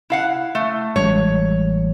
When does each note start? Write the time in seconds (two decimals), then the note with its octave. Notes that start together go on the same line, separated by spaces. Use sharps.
0.10 E4 F5 F#5
0.55 A3
0.96 A1 G3 G#3 C#5